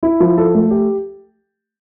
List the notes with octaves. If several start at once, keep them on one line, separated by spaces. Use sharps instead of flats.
E4
F3
A4
A3
G4